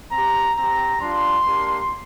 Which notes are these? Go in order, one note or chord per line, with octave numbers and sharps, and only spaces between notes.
C4 G4 A#5
C4 G4 A#5
G3 D4 F4 C6
A#3 D4 G4